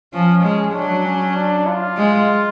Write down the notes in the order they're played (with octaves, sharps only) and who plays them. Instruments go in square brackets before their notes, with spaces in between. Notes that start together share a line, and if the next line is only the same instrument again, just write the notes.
[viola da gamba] F3 [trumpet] C#4
[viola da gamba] G#3
[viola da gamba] F#3 [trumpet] D4
[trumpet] C#4
D4
F4
[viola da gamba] G#3